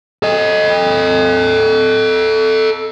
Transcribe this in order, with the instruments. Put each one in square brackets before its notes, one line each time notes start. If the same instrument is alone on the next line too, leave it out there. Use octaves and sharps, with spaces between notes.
[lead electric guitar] A4 D#5